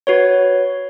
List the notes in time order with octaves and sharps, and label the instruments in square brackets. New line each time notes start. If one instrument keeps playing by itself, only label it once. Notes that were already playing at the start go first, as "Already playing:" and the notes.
[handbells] F#4 B4 C#5